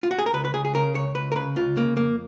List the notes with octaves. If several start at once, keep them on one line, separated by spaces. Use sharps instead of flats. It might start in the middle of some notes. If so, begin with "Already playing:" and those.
F4
F#4
G#4
A#4
C#2 B4
B4
C#2 G#4
G#4
C#3 A#4
C#2 C#5
C#2 B4
A#4
C#3 B4
C#2 F4
C#3 A#3
F2 A#3